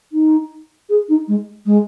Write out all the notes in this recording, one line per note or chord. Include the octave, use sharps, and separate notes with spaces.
D#4
G#4
D#4
G#3
G#3